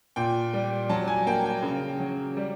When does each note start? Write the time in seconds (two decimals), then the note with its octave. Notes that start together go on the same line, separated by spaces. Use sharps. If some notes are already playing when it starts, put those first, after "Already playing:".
0.16 A#2 G5
0.54 G3
0.89 F#3 A5
1.08 G#5
1.27 A#3 G5
1.45 G5
1.63 C#3
1.99 F#3
2.37 G3